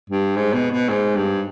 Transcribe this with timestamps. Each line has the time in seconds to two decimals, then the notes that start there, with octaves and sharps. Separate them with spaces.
0.10 G2
0.36 G#2
0.53 B2
0.71 B2
0.89 G#2
1.16 G2